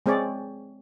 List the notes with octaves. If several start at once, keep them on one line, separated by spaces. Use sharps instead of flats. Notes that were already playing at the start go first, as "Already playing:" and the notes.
G#3 C4 G#4 C#5 D5